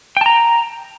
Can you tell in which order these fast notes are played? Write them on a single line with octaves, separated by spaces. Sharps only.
G5 A5 A#5